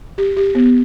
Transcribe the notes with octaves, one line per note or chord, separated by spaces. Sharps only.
G4
G4
B3